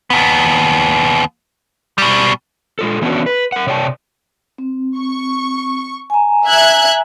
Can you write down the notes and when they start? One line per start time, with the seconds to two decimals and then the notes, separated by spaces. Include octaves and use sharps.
0.10 D#2 B3
1.98 B2 G3
2.79 G#3 F4 A4
3.02 E3 B3 C#4 D4 F#4
3.26 B4
3.52 A#4 F#5
3.67 C3 C#5 D5 G5 A5
4.58 C4
4.98 C#6
6.10 G#5 A#5
6.46 E5 F#6 G#6